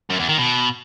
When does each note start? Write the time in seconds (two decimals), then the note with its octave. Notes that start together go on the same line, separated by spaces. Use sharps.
0.10 F#2
0.20 E2
0.29 D#3
0.38 B2